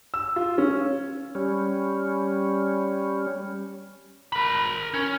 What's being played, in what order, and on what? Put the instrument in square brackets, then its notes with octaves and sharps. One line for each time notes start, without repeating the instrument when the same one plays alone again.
[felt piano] E6
F4
C#4
[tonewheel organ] G3 C#4
[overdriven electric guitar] A#4 B5
C#4